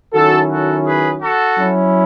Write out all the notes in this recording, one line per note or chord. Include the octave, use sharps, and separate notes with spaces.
D#3 F#3 C#4 E4 F#4 A4
F#4 A4
G#4 B4
F#4 A4
F#3 C#4 E4